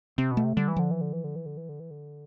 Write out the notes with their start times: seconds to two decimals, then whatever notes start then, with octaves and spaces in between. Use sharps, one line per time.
0.18 C3 C4
0.31 B2
0.37 A3
0.44 C3
0.57 D3 G3
0.68 E3
0.76 D3 F3
0.91 E3
1.01 D3
1.13 E3
1.24 D3
1.36 E3
1.46 D3
1.57 E3
1.69 D3
1.80 E3
1.91 D3